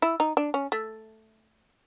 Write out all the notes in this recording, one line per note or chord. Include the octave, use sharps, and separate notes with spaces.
E4
D#4
D4
C#4
A3